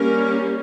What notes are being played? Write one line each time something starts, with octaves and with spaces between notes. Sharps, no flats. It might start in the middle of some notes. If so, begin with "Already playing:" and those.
Already playing: G3 A#3 C#4 A#4